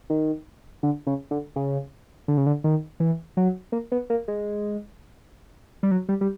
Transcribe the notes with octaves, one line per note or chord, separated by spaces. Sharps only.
D#3
D3
C#3
D3
C#3
D3
C#3
D3
D#3
E3
F#3
A#3
B3
A#3
G#3
G3
F#3
G3
G3